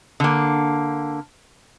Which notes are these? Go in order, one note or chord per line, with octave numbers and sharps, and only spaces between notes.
D3 A#3